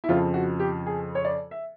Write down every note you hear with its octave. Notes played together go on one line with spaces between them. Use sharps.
E4
F2 C#3 F3 F4
F#4
G4
G#4
C#5
D5
E5